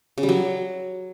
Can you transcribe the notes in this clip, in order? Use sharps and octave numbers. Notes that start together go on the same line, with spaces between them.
C#3
G3
F#3